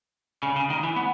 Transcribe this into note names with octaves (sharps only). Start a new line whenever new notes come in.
C#3
C#3
D#3
E3
B3